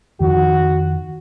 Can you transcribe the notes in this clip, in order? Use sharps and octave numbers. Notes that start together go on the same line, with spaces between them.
F2 D#3 F3 F#4